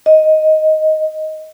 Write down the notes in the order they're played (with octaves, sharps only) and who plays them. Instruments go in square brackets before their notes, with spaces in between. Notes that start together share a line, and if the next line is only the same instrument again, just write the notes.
[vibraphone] D#5